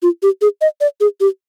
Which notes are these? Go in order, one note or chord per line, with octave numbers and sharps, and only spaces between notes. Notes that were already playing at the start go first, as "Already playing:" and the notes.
F4
G4
G#4
D#5
D5
G#4
G4